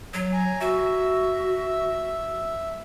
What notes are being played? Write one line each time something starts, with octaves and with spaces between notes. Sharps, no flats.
F#3
G#5 A#5
F#4 E5